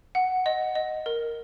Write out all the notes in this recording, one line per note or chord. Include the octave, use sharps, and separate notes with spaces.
F#5
D#5
D#5
A#4